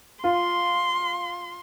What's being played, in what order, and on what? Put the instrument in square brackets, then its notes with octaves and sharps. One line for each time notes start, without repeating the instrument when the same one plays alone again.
[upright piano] F4 [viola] C6